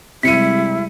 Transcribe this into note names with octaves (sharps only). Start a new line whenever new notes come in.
C3 G3 G#3 E4 B6 C#7 D#7